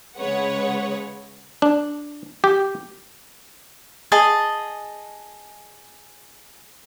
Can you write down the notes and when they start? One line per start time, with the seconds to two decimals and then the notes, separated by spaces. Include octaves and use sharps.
0.17 C#3 G#3 B4 C#5 F#5
1.62 D4
2.44 G4
4.12 G#4 D#5 A5